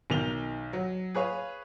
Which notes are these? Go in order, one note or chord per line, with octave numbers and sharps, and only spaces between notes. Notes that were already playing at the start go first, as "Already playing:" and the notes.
B1 D#3 F7 G7
F#3
G#4 B4 C#5 F5